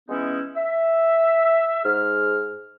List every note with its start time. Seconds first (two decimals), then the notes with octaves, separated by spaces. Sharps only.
0.09 E3 G#3 B3 C#4 D#4 E4
0.56 E5
1.84 G#2 G#4 F6